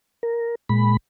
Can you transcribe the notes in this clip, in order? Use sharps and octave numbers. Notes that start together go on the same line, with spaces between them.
A#4
A#2 G#3 B5